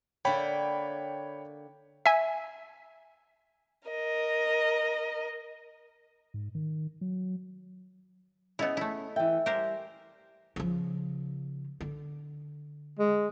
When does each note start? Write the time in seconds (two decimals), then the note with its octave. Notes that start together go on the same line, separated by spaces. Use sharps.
0.25 D3 A#3 C#5 G5 B5
2.06 E5 G#5
3.89 A#4 D#5
6.34 G#2
6.55 D#3
7.01 F#3
8.59 B3 C#4 E4 G#4 C#5 D#5 B5
8.77 A3 E4
9.16 E3 E5 G5
9.46 G3 G4 A#4 C5 G#5
10.56 C#3 F3
11.81 D3
12.99 G#3